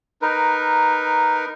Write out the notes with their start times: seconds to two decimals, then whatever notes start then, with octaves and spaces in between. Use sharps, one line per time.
0.22 D#4 A#4 B4